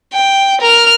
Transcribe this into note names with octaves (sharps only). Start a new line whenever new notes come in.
G5
A#4 F6